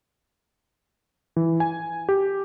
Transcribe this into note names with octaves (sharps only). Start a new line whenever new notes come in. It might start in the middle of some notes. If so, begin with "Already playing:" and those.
E3
G#5
G4